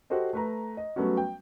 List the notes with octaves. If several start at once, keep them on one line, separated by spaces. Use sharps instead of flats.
F#4 G4 A4 C5 D#5
A3 B4 A#5
D#5
F#3 G3 A3 B3 C#4 F#4
G5